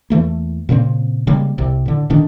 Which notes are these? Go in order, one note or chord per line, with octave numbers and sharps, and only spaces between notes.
E2 E3 A3 A#3
A#2 C#3 A#3 C4
C#3 G3 G#3 A#3
C2 C3
A2 D3
A2 D3 D#3 D4